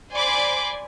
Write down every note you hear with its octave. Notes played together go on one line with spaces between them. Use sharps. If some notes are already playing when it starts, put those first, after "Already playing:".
C5 D5 G#5 B5 C6 D6